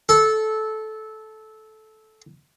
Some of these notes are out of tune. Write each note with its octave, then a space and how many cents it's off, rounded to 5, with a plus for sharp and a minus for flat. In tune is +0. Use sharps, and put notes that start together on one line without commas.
A4 -15